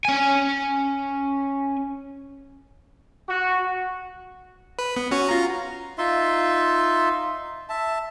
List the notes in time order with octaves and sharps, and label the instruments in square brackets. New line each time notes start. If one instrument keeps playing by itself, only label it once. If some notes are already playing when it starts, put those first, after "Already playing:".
[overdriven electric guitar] C#4 G#5
[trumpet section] F#4
[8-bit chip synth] B4
B3
C#4 F#4 C#5
F4 A#5
[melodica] D#4 F4 E5 C6
E5 A5